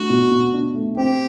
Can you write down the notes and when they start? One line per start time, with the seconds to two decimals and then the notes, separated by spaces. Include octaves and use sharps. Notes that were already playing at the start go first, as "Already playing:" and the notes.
Already playing: A3 D4 F#4
0.10 B2
0.31 B2
0.53 D4
0.75 A3
0.97 C4 G4